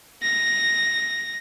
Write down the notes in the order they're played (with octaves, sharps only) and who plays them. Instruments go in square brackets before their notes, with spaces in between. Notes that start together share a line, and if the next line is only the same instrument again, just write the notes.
[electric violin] A#6